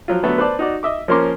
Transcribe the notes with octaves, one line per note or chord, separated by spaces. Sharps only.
F3 F#3 F4
D3 F#3 A3 B3 A4
B4 C5 D5 A5
D#4 F#4 D5
D#5 E5 D6
F3 A#3 C#4 A#4 C6 D6